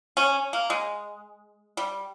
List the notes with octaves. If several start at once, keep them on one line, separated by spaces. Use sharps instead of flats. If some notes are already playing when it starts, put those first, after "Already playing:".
C#4
A#3
G#3
G3